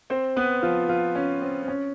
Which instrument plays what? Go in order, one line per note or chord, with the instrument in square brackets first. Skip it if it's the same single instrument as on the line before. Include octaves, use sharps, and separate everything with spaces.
[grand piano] C4 C5
B3 B4
F3 F4
F3 F4
C#4
C4
C4
C#4